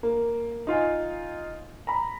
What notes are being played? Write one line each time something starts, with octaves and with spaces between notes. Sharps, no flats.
A#3
D#4 F4 F5 G#5
A#5 B5